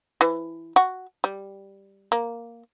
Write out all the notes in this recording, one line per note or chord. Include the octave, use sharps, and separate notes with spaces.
E3
F#4
G3
A#3